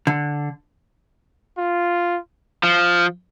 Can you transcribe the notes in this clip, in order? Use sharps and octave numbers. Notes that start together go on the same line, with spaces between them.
D3
F4
F3